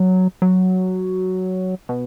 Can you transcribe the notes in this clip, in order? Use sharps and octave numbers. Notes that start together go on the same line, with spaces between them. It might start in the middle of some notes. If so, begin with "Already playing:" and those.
Already playing: F#3
F#3
B2